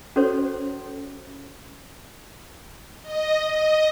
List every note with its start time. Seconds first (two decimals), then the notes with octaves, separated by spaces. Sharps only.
0.16 C#4 F#4 A4 C5 C#5
3.02 D#5
3.51 D#5